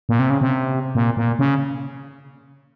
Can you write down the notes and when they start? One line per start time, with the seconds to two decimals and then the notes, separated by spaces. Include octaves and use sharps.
0.09 A#2
0.19 C3
0.30 C#3
0.41 C3
0.95 A#2
1.17 A#2
1.39 C#3